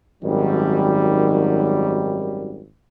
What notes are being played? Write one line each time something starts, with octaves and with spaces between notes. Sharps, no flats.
G#1 F#2 D#3 F#3 G3